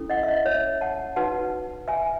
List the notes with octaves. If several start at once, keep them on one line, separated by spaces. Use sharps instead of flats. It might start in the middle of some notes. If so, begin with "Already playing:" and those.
Already playing: C#4 E4 A4
D#5 F#5
E5
D#5
C#5 E5
F#5 A5
D#4 F#4 B4 F#5 A5
E5 G#5